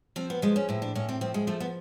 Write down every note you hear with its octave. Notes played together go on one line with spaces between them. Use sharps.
F3 C4
B3
F3 G#3
C#4
A2 E4
D4
A2 C#4
C4
F3 C4
G#3
F3 A3
B3